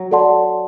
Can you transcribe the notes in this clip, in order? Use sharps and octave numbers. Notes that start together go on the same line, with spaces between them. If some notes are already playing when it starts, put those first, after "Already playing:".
Already playing: F#3
A4 D5 F#5 A5 C6